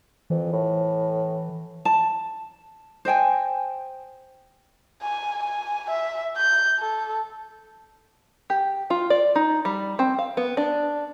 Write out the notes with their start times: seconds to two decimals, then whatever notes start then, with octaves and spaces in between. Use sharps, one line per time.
0.30 F2 E3
0.53 A2
1.85 A5
3.05 C5 D#5 G5 G#5
5.03 G#5
5.43 G#5
5.90 E5
6.37 G6
6.79 A4
8.50 G4
8.90 F4
9.10 D5
9.35 D#4
9.65 G3
9.99 C4
10.19 F5
10.37 B3
10.57 D4